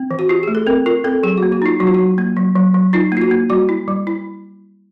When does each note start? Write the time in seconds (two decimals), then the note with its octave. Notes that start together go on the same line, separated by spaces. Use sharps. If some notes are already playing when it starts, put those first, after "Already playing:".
Already playing: C4
0.11 E3
0.19 F#4
0.29 F4 G4
0.43 A3 G#4
0.55 A4
0.67 C4 A#4
0.86 F4 A#4
1.04 C4 A4
1.23 F#3 G#4
1.38 F#4
1.43 A#3
1.52 F#4
1.62 D#4 F4
1.80 F#3 F#4
1.87 F4
1.94 F#3 F#4
2.18 A#3
2.37 F#3
2.56 F#3
2.74 F#3
2.93 D#4 F4
3.12 A#3 F4
3.22 F#4
3.31 A#3
3.50 G3 F#4
3.69 E4
3.88 G3
4.07 E4